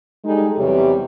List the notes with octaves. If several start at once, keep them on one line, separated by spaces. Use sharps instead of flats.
G3 G#3 D#4 G#4 A4
E2 C3 E3 F#3 G3 C#5